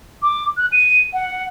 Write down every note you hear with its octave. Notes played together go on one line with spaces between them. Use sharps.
D6
F#6
D#7
F#5